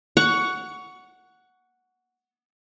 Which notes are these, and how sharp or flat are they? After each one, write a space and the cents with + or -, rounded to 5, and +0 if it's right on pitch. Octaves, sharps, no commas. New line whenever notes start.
F#5 +0 C#6 +20